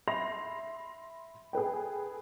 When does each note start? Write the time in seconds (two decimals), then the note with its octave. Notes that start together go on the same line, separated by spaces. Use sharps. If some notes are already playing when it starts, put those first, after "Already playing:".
0.08 E5 B5 C6 A#6 F7
1.53 G#4 A4 B4 G5